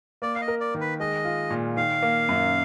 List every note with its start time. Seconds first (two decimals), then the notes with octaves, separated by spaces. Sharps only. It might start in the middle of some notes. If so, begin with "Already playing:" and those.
0.22 A#3 D5
0.35 F5
0.41 D#5
0.48 A#4
0.61 D5
0.74 D#3
0.81 B4
1.00 G#3 D#5
1.25 F4
1.50 A#2
1.76 D#3 F5
2.03 A#3
2.29 F#2